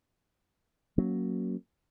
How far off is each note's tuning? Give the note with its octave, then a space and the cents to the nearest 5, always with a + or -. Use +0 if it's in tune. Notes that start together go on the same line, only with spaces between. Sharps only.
F#3 +0 A#3 +0 C#4 +0